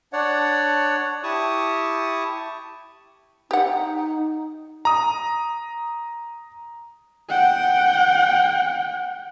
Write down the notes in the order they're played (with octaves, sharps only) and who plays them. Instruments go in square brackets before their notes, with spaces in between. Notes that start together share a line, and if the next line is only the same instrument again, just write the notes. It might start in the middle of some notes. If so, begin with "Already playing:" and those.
[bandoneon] D4 C#5 D5 F#5
E4 G4 A5 C#6 D#6
[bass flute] D#4 [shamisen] G4 F#5
[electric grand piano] A#5 D#6
[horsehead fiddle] F#5 G5